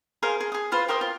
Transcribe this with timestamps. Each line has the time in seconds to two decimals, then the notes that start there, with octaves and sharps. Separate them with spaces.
0.23 G#4 A#4 C5 F5
0.40 G#4
0.52 G#4 D#6
0.72 F4 B4 C5 F5
0.88 G4 A#4 C5 D#6
1.01 F4